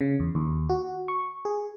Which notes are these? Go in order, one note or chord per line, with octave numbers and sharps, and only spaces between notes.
C#3
E2
D#2
F#4
C#6
G#4